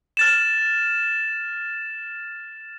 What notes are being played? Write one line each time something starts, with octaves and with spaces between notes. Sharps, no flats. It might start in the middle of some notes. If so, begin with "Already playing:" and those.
F6 A6 E7